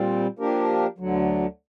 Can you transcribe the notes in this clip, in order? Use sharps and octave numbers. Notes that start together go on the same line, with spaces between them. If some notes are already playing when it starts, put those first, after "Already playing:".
Already playing: A#2 G3 C4
F3 A#3 D4 G4 A#4
D2 D3 F#3